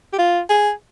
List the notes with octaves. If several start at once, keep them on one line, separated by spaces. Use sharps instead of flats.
G4
F4
G#4